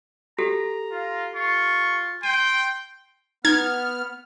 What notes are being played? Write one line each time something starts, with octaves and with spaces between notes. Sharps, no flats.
F#4 G4 A4 A#5
F4
F4 C#6
G5 C6 D#7
B3 D#4 F6 G#6